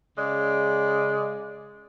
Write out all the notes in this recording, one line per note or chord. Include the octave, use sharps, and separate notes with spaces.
C#3 G#3 D5